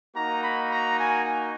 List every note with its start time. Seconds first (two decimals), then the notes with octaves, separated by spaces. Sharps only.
0.15 A#3 D#4 F#4 A#5
0.43 B5
0.71 A#5
1.00 G#5